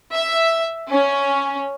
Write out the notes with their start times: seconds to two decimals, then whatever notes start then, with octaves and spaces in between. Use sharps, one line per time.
0.13 E5
0.91 C#4